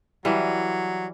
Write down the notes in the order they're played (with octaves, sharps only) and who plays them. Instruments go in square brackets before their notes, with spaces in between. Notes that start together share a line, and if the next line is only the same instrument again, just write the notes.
[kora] E3 G3 [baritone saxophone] F#3